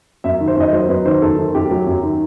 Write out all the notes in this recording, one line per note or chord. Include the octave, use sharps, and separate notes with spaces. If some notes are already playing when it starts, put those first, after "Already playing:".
F#2 E5
D#3
C5
F#2 D#5
F#3 C5
F#2 B4
D#3 C5
F#2 A4
D#3
F#2 G4
F#3
F#2
D#3